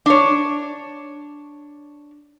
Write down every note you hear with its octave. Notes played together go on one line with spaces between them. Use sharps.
D4 C#5